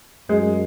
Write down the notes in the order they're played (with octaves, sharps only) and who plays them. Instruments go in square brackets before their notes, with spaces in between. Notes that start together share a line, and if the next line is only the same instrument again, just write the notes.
[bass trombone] F#2 [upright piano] G#3